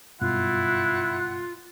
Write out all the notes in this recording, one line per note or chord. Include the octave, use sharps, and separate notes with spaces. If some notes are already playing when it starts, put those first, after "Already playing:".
F#1 G2 B2 E4 F4 F#5